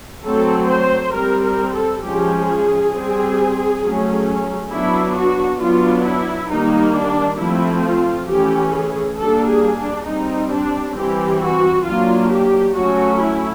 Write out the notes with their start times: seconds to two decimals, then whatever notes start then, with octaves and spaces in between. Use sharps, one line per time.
0.24 F#3 A3 C4 A4
0.69 C5
1.13 G3 C4 A#4
1.43 A#4
1.73 A4
2.02 F3 G#3 C#4 G4
2.47 G#4
2.93 G3 C4
3.82 F#3 A3 C#4
4.70 F#3 B3 D4 E4
5.15 F#4
5.60 F#3 B3 D4 F4
6.04 E4
6.49 D#3 G3 A#3 D#4
6.94 D4
7.38 F3 A3 C4 E4
7.84 F4
8.28 E3 A3 C#4 G4
8.72 G#4
9.17 G3 A#3 D4 A4
9.47 G#4
9.77 D4
10.07 G3 C4 D#4
10.51 D4
10.95 E3 G3 C4 G4
11.41 F#4
11.84 F#3 A#3 D4 F4
12.30 G4
12.74 F#3 A3 C#4 F#4
13.19 E4